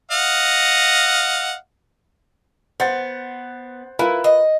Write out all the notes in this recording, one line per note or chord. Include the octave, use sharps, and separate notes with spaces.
D#5 F5 F#5
B3 C5 F#5 A6
E4 F4 A#4 B4
D#5